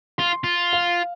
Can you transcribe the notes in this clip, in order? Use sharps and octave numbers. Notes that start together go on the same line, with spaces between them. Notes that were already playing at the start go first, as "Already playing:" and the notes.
F4 C6
F4
F5